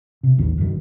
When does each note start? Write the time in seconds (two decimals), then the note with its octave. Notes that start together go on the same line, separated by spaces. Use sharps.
0.23 C3
0.38 A1 D#2 D#3
0.58 F#1 F#2 A#2 D#3